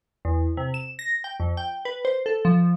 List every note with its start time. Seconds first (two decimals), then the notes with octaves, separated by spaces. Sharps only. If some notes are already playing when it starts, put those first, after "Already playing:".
0.25 E2
0.57 C3
0.74 E7
0.99 A#6
1.24 G5
1.40 F2
1.57 G5
1.85 B4
2.05 C5
2.26 A4
2.45 F3